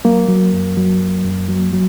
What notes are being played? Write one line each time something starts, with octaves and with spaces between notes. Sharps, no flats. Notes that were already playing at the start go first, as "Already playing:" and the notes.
F#3 A#3
F#3
F#2
F#3
F#2
F#2
F#3
F#3